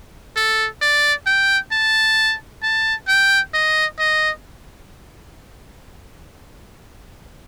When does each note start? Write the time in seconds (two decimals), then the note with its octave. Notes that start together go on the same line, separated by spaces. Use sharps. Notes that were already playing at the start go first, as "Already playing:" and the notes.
0.36 A4
0.81 D5
1.26 G5
1.72 A5
2.63 A5
3.08 G5
3.54 D#5
3.99 D#5